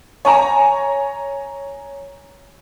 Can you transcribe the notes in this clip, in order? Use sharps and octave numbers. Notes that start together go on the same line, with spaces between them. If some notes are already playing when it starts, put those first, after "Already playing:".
C#5 G#5 A#5